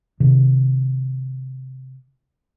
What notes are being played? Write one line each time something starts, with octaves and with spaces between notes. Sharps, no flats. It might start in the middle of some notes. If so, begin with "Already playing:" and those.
C3 D#3